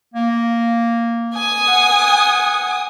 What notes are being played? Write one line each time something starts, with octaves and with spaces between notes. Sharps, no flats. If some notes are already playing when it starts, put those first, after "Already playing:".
A#3
G#5 D#6
F#5